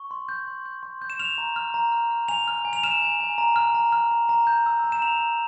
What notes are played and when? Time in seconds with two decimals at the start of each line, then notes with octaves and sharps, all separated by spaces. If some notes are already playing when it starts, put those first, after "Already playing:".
Already playing: C#6
0.11 C6
0.29 G6
0.47 C6
0.66 G6
0.83 C6
1.02 G6
1.10 E7
1.19 F6 F7
1.38 A#5
1.56 F6
1.74 A#5
1.92 F6
2.11 F6
2.28 G#5 F7
2.48 F6
2.65 G#5
2.73 F7
2.83 F6 E7
3.02 G#5
3.20 G#5
3.38 A#5
3.56 F6
3.74 A#5
3.92 F6
4.11 A#5
4.29 A#5
4.47 G6
4.66 E6
4.84 A#5
4.92 E7
5.02 A#5 F7
5.21 A#5